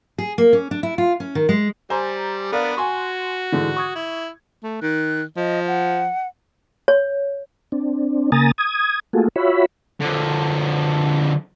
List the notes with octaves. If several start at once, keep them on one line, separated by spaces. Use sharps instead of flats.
G#4
A#3
C#4
D4
E4
F4
C#4
D#3
G#3
G3 C5 G#5 A#5
B3 D4 A#4 D5 F5
F#4 G#5 C6 C#6
G#2 D3 E3
C#6 D#6 G#6
E4
A3
D#3 F#6
F3 D#5
F#5
C#5
C4 D4
C#3 A#3 G#5 A#5 D#6 A6
D#6 G#6
A3 A#3 F4 F#4 G#4 A4
F4 F#4 C#5 E5 B5
D3 F3